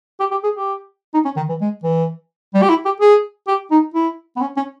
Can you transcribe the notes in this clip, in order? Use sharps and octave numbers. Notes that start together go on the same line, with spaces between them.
G4
G4
G#4
G4
D#4
C#4
D#3
E3
G#3
E3
G3
G4
E4
G4
G#4
G4
D#4
E4
B3
C#4
C#4